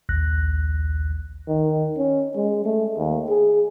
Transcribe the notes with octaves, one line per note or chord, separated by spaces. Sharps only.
A#1 D#2 F#6 A#6
D#3
C#4
G#3
A3
D#2
G#4